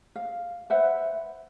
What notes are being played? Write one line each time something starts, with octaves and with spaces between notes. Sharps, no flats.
F5
B4 C5 E5 F#5